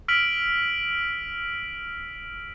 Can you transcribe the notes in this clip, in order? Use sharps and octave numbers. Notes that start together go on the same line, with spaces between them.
E6 F6 B6 D7 F7 F#7